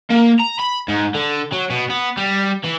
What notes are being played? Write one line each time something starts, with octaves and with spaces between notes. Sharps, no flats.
A#3
A#5
B5
G#2
D3
F#3
B2
B3
G3
E3